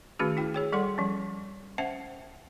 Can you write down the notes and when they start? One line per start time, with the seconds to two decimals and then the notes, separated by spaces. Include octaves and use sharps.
0.19 D#3 A3 C#4 F#4 G#4
0.37 E4 G5
0.54 G#4 C#5 G5
0.73 G3 A4 F#5 C6
0.98 F3 G3 C#4
1.78 C#4 C5 E5 F#5 G5 A5